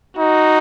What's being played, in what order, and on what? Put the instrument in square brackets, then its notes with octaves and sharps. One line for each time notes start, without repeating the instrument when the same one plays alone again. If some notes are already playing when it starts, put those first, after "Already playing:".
[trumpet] D#4 [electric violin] F#4